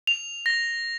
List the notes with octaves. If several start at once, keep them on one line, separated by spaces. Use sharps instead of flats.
F7
A#6